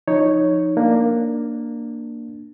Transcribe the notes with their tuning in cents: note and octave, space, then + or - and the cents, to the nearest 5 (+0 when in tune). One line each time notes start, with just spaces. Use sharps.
F3 +0 D#4 +0 C#5 +0
A#3 +0 D4 +10